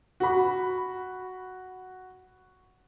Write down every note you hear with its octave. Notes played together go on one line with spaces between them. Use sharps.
F#4 B5